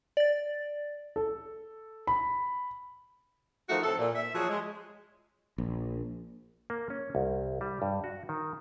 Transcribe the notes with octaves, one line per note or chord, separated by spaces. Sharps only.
D5 A6
A4
B5
D#3 F3 A3 D#4 F#4
A2 C4 A4
A#2
E5
F3 F#3 F#4 G#4
G#3
A#1
A#3
C#4
C2
G3
G2
F#4
D#3